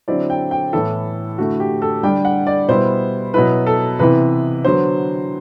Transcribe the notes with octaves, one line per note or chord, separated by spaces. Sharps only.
D3 F#3 C4 E4 D5
G5
G5
A2 E3 B3 E4 A4
D3 A3 E4 F#4
G4
A4
D3 G3 D4 G5
F#5
D5
B2 G3 B3 E4 C5
B2 F#3 B3 E4 B4
A4
C3 E3 B3 E4 B4
D3 F#3 B3 C5